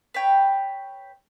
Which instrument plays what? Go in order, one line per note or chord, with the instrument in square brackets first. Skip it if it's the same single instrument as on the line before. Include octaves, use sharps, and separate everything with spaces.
[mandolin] B4 C#5 G5